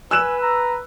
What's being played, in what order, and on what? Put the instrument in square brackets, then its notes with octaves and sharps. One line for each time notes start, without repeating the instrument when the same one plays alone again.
[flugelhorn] B4 [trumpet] G#5 [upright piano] E6 F#6 E7
[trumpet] A#5